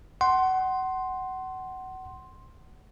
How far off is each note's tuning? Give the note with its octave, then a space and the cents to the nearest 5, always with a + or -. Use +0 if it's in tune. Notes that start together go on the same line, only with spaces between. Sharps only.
F#5 +25 C6 +5